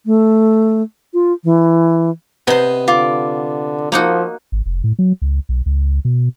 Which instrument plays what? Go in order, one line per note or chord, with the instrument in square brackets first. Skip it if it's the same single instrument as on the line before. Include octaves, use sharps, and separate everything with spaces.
[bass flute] A3
F4
E3
[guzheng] C3 C5 [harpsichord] B3 [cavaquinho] D#5
[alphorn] D3 [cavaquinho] F4 D6
[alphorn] F3 [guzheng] A#3 D#4 F#4
[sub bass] G#1
F1
A2
F#3
C#2
B1
C#2
B2